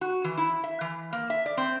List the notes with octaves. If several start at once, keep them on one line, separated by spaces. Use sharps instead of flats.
F#4
E3
E4
E5
E3
A#3
E5
D5
C4